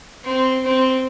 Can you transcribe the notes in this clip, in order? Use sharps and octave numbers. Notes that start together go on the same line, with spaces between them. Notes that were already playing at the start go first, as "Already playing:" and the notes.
C4
C4